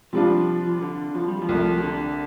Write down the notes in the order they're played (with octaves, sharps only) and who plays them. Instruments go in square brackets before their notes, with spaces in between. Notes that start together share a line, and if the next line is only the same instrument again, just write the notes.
[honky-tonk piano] C3 G3 D4 F4 [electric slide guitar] F3
[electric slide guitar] D3
F3
G3
F3
[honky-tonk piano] C2 C3 A3
[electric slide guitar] F3
D3